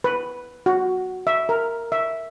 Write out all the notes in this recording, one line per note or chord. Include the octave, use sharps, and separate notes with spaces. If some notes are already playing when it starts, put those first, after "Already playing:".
B4
F#4
E5
A#4
E5